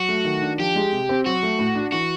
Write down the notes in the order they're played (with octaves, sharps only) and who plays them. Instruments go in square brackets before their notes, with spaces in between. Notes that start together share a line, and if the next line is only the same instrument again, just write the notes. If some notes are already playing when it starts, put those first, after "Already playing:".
Already playing: [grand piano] F#3 [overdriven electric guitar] F#4
[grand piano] A3
D#3
D4
[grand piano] F3 [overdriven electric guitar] G4
[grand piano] G#3
C3
C4
[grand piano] F#3 [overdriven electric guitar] F#4
[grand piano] A3
A2
D4
[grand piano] E3 [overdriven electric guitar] F#4